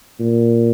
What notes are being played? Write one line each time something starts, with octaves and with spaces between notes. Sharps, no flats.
A#2